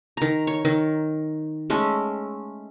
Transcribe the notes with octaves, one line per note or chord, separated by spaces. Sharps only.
D#3 A#5
C#5
D#3
G#3 A3 C#4